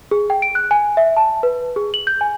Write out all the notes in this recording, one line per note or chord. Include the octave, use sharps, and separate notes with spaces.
G#4
G5
D7
F#6
G#5
E5
A5
B4
G#4
F#7
G6
G#5